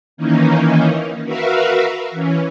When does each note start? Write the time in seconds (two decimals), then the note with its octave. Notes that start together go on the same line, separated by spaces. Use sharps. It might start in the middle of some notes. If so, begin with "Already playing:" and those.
0.17 D#3 E3 A#3 C#4 D#4
1.23 F#4 A#4 B4 E5 F5
2.11 E3 C#4